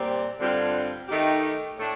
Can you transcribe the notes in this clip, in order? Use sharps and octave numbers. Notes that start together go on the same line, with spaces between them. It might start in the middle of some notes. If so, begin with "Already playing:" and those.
Already playing: A#2 G3 C4 G4
G2 D3 G3 C4 F4
D#3 A3 D#4 G4
A2 A3 D4